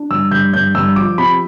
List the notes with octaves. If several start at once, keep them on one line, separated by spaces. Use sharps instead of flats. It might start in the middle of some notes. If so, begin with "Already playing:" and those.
Already playing: D4
G2 E6
G2 G6
G2 G6
G2 E6
F3 D6
C3 B5